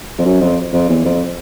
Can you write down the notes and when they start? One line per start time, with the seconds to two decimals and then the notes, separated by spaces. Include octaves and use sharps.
0.18 F2
0.25 F#2
0.41 F2
0.73 F2
0.89 E2
1.05 F2